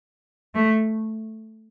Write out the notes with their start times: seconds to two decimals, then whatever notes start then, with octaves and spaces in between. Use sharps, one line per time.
0.55 A3